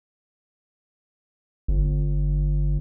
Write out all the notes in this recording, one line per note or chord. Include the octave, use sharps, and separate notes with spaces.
G1